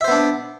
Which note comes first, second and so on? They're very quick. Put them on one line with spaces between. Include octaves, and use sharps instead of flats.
E5 C5 B3 D4